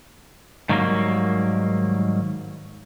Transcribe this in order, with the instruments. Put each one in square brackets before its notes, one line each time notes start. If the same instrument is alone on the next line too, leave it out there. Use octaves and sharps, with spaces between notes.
[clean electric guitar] G#2 D#3 F#3 G3 A3 A#3